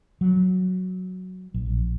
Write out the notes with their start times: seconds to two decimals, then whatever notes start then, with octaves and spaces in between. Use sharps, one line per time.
0.21 F#3
1.54 A#1